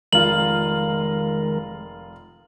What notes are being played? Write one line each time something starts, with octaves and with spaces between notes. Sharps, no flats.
F1 D#3 G#3 F4 A#4 F#7